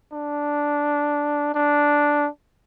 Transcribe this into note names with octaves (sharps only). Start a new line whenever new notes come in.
D4
D4